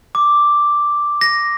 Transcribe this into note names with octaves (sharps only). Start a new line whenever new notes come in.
D6
A#6